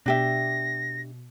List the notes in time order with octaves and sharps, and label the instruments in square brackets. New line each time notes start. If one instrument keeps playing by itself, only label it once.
[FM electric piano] B2 [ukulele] D4 G4 E5 [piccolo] A#6